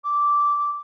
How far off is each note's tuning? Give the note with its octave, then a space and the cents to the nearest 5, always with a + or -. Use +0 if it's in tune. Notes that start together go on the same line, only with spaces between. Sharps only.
D6 -10